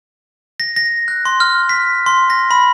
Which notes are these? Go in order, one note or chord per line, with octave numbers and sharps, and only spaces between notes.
A#6
A#6
F#6
C6
F6
B6
C6
A#6
B5